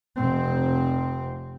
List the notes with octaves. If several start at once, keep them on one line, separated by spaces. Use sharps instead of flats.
F1 C4